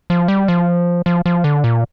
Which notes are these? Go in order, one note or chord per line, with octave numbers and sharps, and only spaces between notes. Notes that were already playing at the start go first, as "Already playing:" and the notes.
F3
G3
F3
F3
F3
D3
A#2